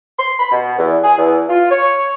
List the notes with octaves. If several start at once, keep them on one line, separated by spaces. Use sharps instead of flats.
C6
B5
B2
E2
G#4
E2
F4
C#5